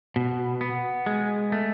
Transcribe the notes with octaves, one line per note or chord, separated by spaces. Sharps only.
B2
B3
G#3
A3